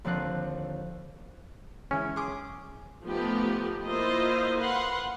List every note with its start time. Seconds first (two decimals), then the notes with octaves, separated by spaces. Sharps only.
0.04 D#2 D3 F3 C4 C5 F#6
1.91 E3 G#3 C#4
2.16 G#4 C6 D6
3.03 F3 A3 B3 D#4 G4
3.86 A#3 E4 F4 C5 D#5
4.59 B4 F5 F#5 C6